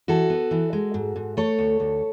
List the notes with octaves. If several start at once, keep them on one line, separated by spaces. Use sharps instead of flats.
E3 F#4 A4
B3
E3
G#3
G#2
G#2
A3 A4 C#5
D2
D2